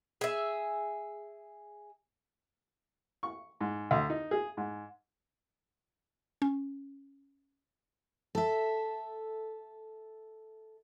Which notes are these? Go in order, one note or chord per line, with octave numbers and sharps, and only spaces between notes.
G#4 E5
C#6
G#2
D2
D#4
G#4
G#2
C#4
A4 E5